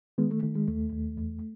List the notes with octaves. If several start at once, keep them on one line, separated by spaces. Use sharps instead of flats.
D#3 G#3 B3
A3
D#3 A3
G#3
D#2 A3
D#2
E2